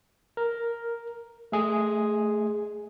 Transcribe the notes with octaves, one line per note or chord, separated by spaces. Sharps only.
A#4
A3 G#4